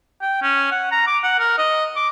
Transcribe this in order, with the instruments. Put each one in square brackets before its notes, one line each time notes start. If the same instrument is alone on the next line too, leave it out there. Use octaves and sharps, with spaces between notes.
[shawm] G5
C#4
F#5
A#5
D6
F#5
A#4
D#5
D6